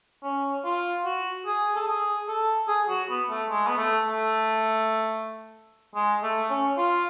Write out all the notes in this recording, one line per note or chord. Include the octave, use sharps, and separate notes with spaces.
C#4
F4
F#4
G#4
A4
G#4
A4
G#4
F#4
B3
A3
G#3
B3
A3
A3
G#3
A3
C#4
F4